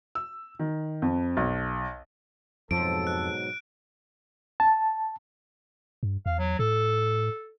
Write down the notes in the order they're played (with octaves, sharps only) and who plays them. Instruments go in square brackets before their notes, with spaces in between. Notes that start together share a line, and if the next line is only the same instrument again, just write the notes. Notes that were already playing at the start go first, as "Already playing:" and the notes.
[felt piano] E6
D#3
F2
B1
[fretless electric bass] F2 F3 [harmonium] G#2 B2 F#3 [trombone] A4 [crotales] D7
[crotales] F#6
[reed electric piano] A5
[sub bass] G2
[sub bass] E2 [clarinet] F5
[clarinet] F#3
[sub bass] A2 [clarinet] A4